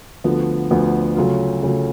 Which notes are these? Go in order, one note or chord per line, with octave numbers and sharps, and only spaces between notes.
D2 D3 F3 B3
D2 D3 F3 B3
C#3 F#3 A3 F4
C#3 F#3 A3 F4